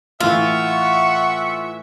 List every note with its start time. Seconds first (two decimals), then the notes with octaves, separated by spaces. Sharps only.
0.20 A2 E3 F4 E5 F#5 C#6